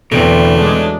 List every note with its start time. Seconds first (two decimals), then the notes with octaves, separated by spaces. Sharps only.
0.12 E2 B2 D3 A3 C4
0.58 F#3 G#3 D4